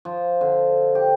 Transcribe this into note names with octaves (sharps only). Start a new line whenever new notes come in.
F3
D3
G4